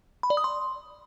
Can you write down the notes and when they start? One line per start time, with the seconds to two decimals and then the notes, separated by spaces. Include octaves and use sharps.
0.23 B5
0.30 D5
0.37 D#6
0.44 C6